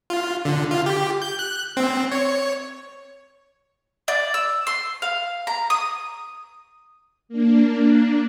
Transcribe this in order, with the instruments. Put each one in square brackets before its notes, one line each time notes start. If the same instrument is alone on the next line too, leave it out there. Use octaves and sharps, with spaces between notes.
[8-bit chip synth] F4
D3
F4
G4
G6
F#6
C4
C#5
[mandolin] D5
E6
C6
F5
A#5
D#6
[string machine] A#3 D4